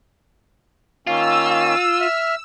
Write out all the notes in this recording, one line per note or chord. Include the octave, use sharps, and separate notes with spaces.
D#3 A#3 C#4 F4 E6
E5 F6